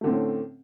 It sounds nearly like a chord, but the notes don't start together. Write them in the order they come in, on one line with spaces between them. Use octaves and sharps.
A3 D3 C4 A2 C#4